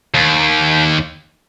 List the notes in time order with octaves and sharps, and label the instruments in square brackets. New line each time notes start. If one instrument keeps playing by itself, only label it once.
[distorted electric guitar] D#2